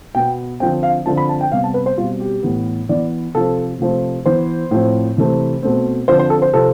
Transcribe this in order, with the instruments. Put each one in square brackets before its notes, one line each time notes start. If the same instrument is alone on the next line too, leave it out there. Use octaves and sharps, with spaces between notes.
[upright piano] B2 B3 G5
C4 G5
D3 F3
F5
D3 F3 C4 A5
B5
A5
G5
C3 G3 B3 F5
A5
B4
C5
B2 G3 C4 F4
G4
A2 E3 B3
E3 B3 D5
C3 F3 C4 A4
C3 F3 A3 C4
E3 B3 C5
A2 F3 C4
C3 E3 A3 C4
B2 A3 C4
D3 F3 C4 C5
C5
A4
C5
C3 F3 C4 A4